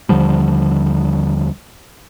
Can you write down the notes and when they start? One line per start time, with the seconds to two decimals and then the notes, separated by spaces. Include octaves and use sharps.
0.09 D#2 D3 F3 G3